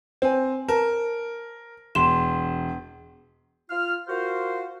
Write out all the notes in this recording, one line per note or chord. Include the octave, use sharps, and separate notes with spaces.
C4 C5 G#5
A#4 A5
E1 C6 E7
F4 F6
F4 F#4 A#4 C5